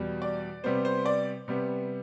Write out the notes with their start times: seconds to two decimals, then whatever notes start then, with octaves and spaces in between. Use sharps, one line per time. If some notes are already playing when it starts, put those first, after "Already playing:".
Already playing: E2 B2 G3
0.22 D5
0.64 C3 G3 B3 C5
0.85 C5
1.06 D5
1.48 C3 G3 B3